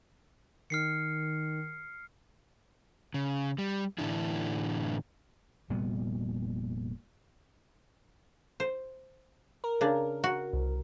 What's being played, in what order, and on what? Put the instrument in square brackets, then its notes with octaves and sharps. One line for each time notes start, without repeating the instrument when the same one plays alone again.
[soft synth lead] D#3 [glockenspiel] F6 C7 C#7
[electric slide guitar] C#3
G3
A2 D3 E3 D4 E4
[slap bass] F1 A#2 G3 B3
[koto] C5
[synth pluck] A#4
[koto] C#3 D4
F#4
[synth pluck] C2